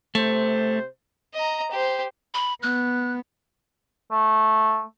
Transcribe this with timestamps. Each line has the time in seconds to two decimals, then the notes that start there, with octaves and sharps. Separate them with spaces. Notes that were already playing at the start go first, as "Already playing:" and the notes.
0.15 C3 A3 C5
1.35 D#5 A#5
1.72 G4 C5
2.34 B5
2.63 B3 F#6
4.11 A3